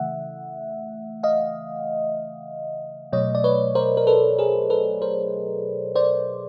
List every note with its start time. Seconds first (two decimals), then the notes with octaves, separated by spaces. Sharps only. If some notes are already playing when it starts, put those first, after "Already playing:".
Already playing: C#3 E3 A3 E5 F#5
1.23 D#5 F5
3.13 B2 F#3 A3 C#5 D#5
3.35 D5
3.44 B4 C#5
3.75 A#4 C5
3.97 A#4
4.07 A4 B4
4.38 G#4 A#4
4.70 A4 B4
5.02 A#4 C5
5.96 C5 D5